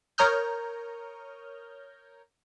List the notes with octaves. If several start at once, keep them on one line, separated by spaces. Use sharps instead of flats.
A#4 C#5 A#5 D#6 F6 G6